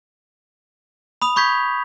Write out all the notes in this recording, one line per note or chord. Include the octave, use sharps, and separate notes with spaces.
B5 D#6 F7
B5 C#6 G6 G#6 B6